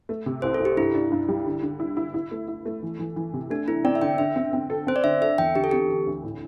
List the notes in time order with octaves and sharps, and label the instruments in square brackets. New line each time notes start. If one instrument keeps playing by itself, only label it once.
[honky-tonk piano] A3
C3
[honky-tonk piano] C2 [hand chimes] C5
[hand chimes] A4
[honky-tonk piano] C2
[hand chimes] G4
[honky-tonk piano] G2 [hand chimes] E4
[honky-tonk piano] D4
G2
G3
D3
D3
E4
E4
E4
A3
E4
A3
E3
E3
E3
C3
[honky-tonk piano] A3 [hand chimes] D4
[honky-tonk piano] A3 [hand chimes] E4
[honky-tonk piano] C4 [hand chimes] D5
[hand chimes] E5
[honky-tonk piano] D3 [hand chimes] G5
[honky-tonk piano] D3 [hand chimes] E5
[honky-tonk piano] C4
C4
A4
[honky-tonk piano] C4 [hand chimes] C5
[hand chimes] D5
[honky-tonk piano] D3 [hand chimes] E5
[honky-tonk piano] A4 [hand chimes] E5
[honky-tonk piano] E2 [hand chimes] G5
[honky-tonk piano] D3 [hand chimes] G4
[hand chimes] A4
[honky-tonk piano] C4 [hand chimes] G4
[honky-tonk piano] D3
D2
A2